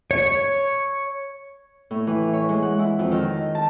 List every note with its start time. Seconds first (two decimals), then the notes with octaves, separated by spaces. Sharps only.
0.11 C#5
1.91 A2
2.07 E3
2.33 C#5
2.49 G#3
2.62 F#5
2.79 E4
2.99 F2
3.12 D#3
3.55 A5